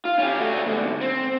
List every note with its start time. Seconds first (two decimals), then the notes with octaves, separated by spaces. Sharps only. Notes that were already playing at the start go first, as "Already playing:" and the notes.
0.05 F4
0.19 C#4 G4
0.40 A3 F#4
0.66 G#2 D3
1.01 C4